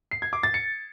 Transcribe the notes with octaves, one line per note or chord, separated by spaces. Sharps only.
C7
G#6
D6
A6
C#7